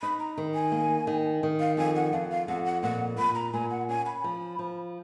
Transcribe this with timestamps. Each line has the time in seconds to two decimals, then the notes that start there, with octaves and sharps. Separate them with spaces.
0.02 D#4 B5
0.20 A#5
0.37 D#3
0.54 G#5
0.72 A#3
1.07 D#3
1.43 D#3
1.60 F5
1.77 F2 G#5
1.96 F#5
2.13 F2 F5
2.30 F5
2.48 F2 F#5
2.65 F#5
2.83 A#2 F#5
3.18 A#2 B5
3.35 A#5
3.53 A#2 G#5
3.71 F#5
3.89 C#4 G#5
4.06 B5
4.24 F3
4.59 F3